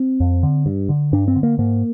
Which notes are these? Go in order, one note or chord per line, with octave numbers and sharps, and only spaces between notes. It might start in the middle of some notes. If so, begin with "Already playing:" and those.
Already playing: C4
F2
D3
G2
D3
G2 D4
C4
D3
A#3
G#2 A#3